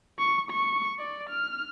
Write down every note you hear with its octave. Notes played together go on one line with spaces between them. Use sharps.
C#6
C#6
D5
F6